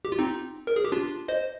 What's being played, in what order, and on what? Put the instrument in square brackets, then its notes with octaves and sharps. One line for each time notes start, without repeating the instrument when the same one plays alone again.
[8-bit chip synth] G4
F4
C4 D#4
A#4
G#4
G4
D4 F4
C5 D#5